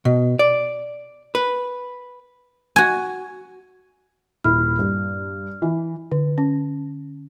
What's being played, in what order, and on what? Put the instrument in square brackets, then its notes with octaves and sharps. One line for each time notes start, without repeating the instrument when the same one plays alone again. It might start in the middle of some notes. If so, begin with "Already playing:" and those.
[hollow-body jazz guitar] B2
D5
B4
[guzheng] F#4 G#5
[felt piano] D#1 E4 [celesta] F6
[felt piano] G2
E3
[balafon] D3
C#4